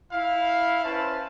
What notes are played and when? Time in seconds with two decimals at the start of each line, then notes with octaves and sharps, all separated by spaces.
0.11 E4 F5
0.84 C#4 B4 C5 A5